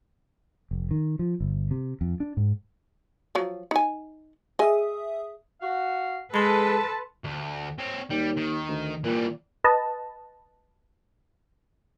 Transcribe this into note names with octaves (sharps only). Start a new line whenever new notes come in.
F1
D#3
F3
G1
C3
F2
D4
G#2
F3 F#3
D#4 G#5
G#4 D#5 E5 G#5 D#6
F#4 F5
G#3 A4 B4 A5 B5 C6
D2
C4 C#5
D#2 G3
D#3
D2
A#2 E3 G3
B4 D#5 A5